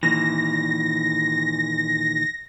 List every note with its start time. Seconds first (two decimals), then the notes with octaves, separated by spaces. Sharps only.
0.03 A#2 D#3 E3 A#6